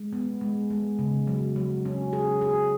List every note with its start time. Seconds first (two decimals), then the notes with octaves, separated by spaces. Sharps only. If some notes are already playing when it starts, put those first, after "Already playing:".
Already playing: G#3
0.13 B3
0.41 G#3
0.70 G#3
0.99 C#3
1.27 F#3
1.56 F#3
1.85 C#4
2.13 G#4
2.41 G#4